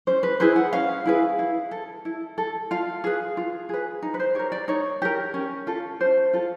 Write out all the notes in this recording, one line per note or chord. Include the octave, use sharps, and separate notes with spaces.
C#4 C5
B4
E4 G#4 B4 C5
F#5
C#4 F5
E4 G#4 B4
E4
A4
E4
A4
F4 F5
G#4 B4
F4
G#4 B4
D#4
B4
C5
G4 A#4 C#5
D5
D#4 C#5
G4 A#4
C#4
F4 A4
C#4 C5
F4 A4